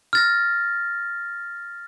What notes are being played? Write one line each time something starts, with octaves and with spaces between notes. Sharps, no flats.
F6 A6 A#6